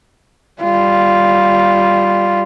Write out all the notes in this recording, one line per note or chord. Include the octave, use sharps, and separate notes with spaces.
G3 F4